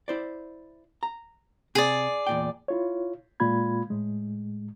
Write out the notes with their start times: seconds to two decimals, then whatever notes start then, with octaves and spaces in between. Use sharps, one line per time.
0.08 E4 C5 D5
1.03 A#5
1.75 C3 G#4 D5
2.27 E2 A#2 G5
2.68 E4 F4 C#5
3.40 A#2 G#3 A#3 F4 B5 G#6
3.90 A2 G#3